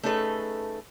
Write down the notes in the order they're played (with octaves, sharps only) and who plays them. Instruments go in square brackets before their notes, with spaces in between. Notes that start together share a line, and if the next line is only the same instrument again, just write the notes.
[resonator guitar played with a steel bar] A3 C#4 D#4 G#4 A4 B4